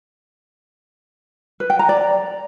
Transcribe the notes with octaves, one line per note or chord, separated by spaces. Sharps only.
B4
G5
A#5
D5